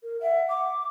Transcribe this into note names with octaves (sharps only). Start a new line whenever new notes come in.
A#4
E5 F#5
D6